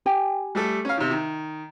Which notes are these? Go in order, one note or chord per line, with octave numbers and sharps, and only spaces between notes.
G4 G5 G#5
G3 A3 A4
C#4 F5
C3 D#3
D#3